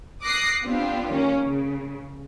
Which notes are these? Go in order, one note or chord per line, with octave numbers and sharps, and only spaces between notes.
D6 D#6 F#6 A#6 C7
B3 C4 D4 F4 G4
D#3 A#3 C#4
C#3